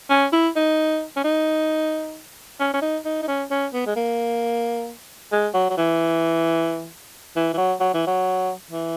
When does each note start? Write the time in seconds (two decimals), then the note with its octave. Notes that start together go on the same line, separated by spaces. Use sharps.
0.10 C#4
0.33 E4
0.56 D#4
1.16 C#4
1.24 D#4
2.60 C#4
2.73 C#4
2.82 D#4
3.05 D#4
3.22 D#4
3.28 C#4
3.51 C#4
3.73 B3
3.86 G#3
3.96 A#3
5.32 G#3
5.54 F#3
5.70 F#3
5.77 E3
7.36 E3
7.53 E3
7.57 F#3
7.80 F#3
7.94 E3
8.07 F#3
8.71 E3